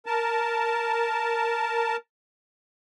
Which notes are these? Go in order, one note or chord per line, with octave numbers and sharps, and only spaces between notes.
A#4 A5